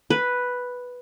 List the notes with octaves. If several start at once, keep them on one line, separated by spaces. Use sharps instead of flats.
B4